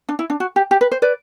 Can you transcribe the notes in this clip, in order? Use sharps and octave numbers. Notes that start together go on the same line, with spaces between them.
D4
E4
D4
F#4
G4
G4
B4
C5
B4 D5